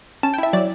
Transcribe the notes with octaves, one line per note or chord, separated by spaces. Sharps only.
C#4 A5
G5
E4 E5
F#3 D5